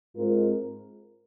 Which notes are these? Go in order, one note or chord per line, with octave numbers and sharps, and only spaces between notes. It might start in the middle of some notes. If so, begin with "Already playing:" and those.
G#2 G#3 C4 F4 A#4